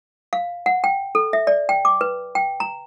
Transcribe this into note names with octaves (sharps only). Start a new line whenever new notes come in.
F5
F#5
G5
A4
E5
D5
G5
D6
B4
G5
A#5